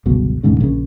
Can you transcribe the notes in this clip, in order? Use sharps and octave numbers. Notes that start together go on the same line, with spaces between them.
G1 C#2 B2 F#3
E1 D2 G#2 C#3
A#1 C#3